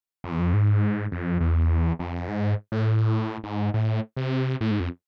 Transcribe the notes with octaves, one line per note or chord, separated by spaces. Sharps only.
F2
E2
F2
G#2
F2
E2
F2
G#2
A2
G#2
A2
C3
A2
G#2
F2